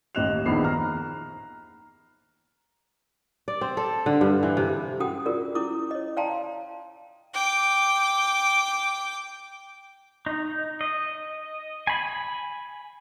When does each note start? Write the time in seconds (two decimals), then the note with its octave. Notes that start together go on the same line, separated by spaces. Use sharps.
0.15 A1 D#2 D#5 F#6 E7 F7
0.46 A#1 E2 D#3 B5 C7
0.64 A#5 F6
3.48 D5
3.61 C4
3.77 A4
4.06 D3
4.21 G2
4.43 E3
4.57 C3
5.00 C#4 F#4 A4 F#5 G5 D#6
5.26 F4 F#4 G#4 A#4 D5
5.55 C#4 E4 D6 D#6
5.91 C#5 D#5
6.17 D5 F5 G5 A5 A#5 C6
7.34 G5 D6
10.26 D#4
10.81 D#5
11.87 G#5 B5